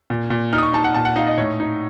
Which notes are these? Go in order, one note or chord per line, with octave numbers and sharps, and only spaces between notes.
A#2
A#2
D#4 F6
D#6
C#6
D#4 A5
F#5
A#2 A5
F#5
D#4 F5
D#5
A2 C#5
D#4